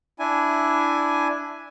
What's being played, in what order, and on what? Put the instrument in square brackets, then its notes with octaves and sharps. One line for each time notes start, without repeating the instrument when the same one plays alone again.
[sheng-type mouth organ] D4 E4 G#5